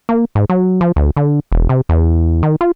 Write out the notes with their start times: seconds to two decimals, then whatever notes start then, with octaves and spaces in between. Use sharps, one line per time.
0.09 A#3
0.35 G#2
0.50 F#3
0.81 F3
0.96 D2
1.17 D3
1.52 E1
1.69 C3
1.89 E2
2.43 D#3
2.61 F4